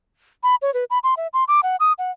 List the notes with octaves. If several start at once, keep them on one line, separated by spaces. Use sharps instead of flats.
B5
C#5
B4
B5
C6
E5
C6
D6
F#5
D#6
F#5